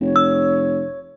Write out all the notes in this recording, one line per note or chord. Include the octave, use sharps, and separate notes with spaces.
F1 C#5
E6